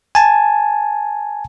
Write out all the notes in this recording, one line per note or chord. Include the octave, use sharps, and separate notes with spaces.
G#5 A5